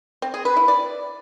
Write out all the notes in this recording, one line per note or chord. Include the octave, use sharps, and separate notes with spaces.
C4
G#4
B4
E4
D5